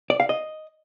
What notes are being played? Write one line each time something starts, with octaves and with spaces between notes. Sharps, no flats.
D5
F5
D#5